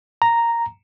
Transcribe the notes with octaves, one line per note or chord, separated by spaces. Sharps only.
A#5